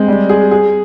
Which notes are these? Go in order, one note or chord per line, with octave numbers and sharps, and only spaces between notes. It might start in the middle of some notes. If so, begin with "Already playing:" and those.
Already playing: G#3 C4
G3
G#4
G#4